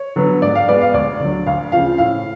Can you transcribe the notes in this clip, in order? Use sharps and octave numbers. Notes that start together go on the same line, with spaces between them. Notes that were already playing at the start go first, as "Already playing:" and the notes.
Already playing: C#5
D3 F#3 B3
G#2 D5
F5
G#3 B3 D5
F5
D2 D5
D3 F#3
D2 F5
C#3 F3 F5
A2 F5